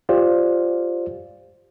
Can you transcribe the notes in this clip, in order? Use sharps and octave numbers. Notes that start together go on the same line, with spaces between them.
F4 G4 C5 D5 F5